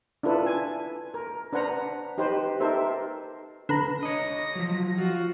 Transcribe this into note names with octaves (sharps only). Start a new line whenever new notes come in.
D4 E4 F4 A4 B4
G#5
A#4
D4 B4 C5 F#5 A#5
D#4 G4 B4 C5
D#4 G4 A4 A#4 C5 E5
D3 B4 A#5
C#5 D#5 A#6
F3 F#3
F4 F#4